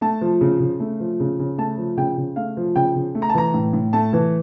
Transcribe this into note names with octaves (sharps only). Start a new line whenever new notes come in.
A3 A5
F3
C#3
C#3
A3
F3
C#3
C#3
A3 A5
F3
C#3 G5
C#3
A3 F5
F3
C#3 G5
C#3
A3
A#5
A5
E3 A#5
A2
A2
A3 A5
E3